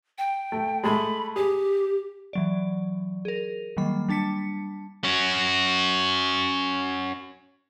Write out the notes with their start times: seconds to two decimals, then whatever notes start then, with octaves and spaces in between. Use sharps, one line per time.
0.18 G5
0.52 A3
0.84 G#3 A3 B5
1.36 G4 G#4
2.33 E3 F#3 D5
3.25 G#4 A#4
3.77 D#3 F#3 G3 A#3 B5
4.09 G3 D4 A5 B6 C#7
5.04 C#4 F#4